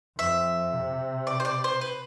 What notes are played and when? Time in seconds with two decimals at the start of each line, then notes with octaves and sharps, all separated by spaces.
0.18 F2 E5
0.73 C3
1.27 D5
1.40 C5
1.45 D5
1.64 C5
1.81 B4